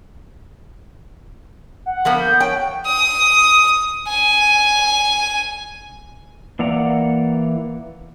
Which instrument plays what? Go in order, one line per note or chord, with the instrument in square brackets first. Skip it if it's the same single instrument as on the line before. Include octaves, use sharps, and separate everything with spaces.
[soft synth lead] F#5
[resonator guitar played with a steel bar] F3 A#3 B3
[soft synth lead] G6
[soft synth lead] C#5 [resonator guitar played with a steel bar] G5
[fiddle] D#6
G#5
[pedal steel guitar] E3 A#3 D5 F#5 A#5